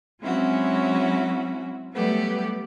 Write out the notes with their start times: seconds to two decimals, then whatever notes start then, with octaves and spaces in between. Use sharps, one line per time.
0.21 F#3 G#3 C4 C#4 E4 F#4
1.93 F#3 G3 A3 B3 G4